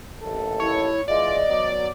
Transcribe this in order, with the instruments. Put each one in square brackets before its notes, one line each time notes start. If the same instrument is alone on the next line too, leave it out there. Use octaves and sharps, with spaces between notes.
[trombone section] A1 D#2 A4
[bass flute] E4 [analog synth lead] C#5
[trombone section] E3 G#3 F4 [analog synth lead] D5 [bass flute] D#5
[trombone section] B2 F#3